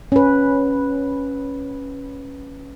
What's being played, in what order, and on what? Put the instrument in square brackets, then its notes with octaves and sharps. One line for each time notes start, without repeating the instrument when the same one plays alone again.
[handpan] C#4 B4